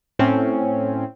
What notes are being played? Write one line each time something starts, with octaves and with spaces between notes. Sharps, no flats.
A2 C4 C#4